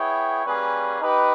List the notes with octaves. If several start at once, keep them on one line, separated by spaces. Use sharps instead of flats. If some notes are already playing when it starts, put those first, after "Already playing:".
Already playing: B3 E4 G#4 C#5 G5
G3 A#3 C#4 G#4 B4
D#4 G4 B4